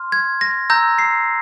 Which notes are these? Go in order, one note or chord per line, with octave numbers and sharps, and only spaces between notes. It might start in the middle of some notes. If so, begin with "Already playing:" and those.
Already playing: C6 F6
G#6
A#6
A#5 E6 G6 A#6
C7